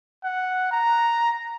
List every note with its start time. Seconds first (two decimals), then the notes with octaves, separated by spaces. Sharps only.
0.24 F#5
0.71 A#5